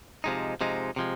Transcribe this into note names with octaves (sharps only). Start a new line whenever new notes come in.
C3 F3 G#3 D#4
C3 F3 G#3 D#4
C3 F3 G#3